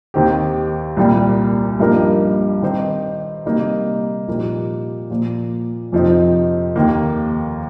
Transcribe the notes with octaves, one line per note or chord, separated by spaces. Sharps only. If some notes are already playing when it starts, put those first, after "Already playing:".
D#2 D#3 C4 G4
C2 A#2 G3 A#3
G2 F3 A#3 D#4 A#4
D#3 C4 D#4 C5
C3 G3 A#3 D#4 G4
A#2 F3 A#3 D#4 G4
A#2 F3 A#3
F2 C3 F3 C4 D#4
D#2 D#3 A#3